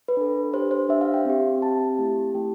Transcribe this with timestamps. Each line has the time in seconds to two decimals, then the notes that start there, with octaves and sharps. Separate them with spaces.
0.08 B4
0.17 D4 A4
0.53 D4 G4 C5
0.71 C5
0.89 D4 G4 E5
1.01 F5
1.14 G5
1.25 C4 G4
1.62 C4 G4 A5
1.98 A3 E4 G4
2.35 A3 E4 G4 G5